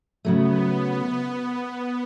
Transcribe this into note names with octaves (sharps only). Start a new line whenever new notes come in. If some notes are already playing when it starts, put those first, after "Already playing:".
C#3 F#3 A3 B3